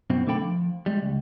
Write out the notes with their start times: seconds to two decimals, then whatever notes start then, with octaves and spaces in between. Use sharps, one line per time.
0.10 F#2 B2 C4
0.27 D3 A3 D4 A4 G5 B5
0.42 F3
0.86 G3 G#3
1.02 C#2